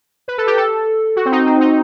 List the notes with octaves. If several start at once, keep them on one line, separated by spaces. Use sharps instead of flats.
B4
A4
G4
A4
F#4
C4
D#4
C4
D#4